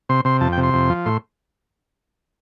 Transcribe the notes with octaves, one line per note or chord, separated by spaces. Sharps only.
C3 C6
C3 C6
F2 A5
G5
C3
C6
F2
F3
A2 C6